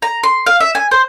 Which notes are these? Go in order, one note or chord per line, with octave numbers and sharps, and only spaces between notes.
A#5
C6
F5
E5
G#5
C5